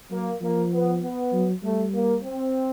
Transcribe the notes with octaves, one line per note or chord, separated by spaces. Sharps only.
F#3 A#3
F3 A#3
B3
B3
F#3
G3 A3
A#3
C4